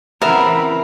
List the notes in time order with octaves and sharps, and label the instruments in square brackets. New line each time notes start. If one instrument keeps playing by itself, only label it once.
[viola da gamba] C#3 E3 C4 [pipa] B3 E5 [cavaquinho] A#4 [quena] B5